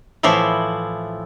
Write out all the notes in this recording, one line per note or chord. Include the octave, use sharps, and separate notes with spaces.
A2 E3 F3 E4